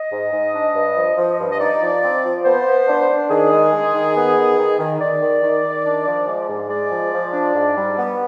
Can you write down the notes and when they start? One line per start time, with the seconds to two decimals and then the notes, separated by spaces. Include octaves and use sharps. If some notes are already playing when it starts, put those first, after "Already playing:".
Already playing: D#5
0.11 G#2
0.33 G#2
0.55 D4
0.75 G2
0.96 F3
1.17 F3
1.39 G2
1.52 D#5
1.60 D#4 D5
1.82 F3
2.03 C4
2.24 F3
2.45 B3 C5
2.67 B3
2.88 D4
3.09 D4
3.30 D#3 G#4
3.51 G#3
3.72 G#3
3.93 D#3
4.16 B3
4.37 D#3
4.58 D#3
4.79 D#3
5.01 D#3 D5
5.21 D#3
5.43 D#3
5.64 D#3
5.85 D4
6.07 F3
6.28 G#3
6.49 G#2
6.69 G#3 D5
6.91 F3
7.13 F3
7.33 D4
7.55 G#2
7.76 G3
7.98 B3